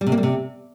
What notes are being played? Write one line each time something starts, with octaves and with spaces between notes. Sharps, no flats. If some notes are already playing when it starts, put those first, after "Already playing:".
G3
C3
A#3
G3
C3